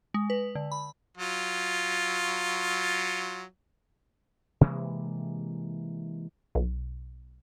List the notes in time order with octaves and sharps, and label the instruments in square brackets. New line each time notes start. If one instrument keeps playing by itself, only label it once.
[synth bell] G#3
B4
D3
B5
[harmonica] F#3 F4
[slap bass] C3 E3 G#3 A#3
[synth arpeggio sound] B1